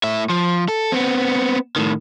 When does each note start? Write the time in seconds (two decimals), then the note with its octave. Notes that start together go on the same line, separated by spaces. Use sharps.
0.03 A2 E5
0.29 F3
0.68 A4
0.92 B3 C4
1.76 A2 D#3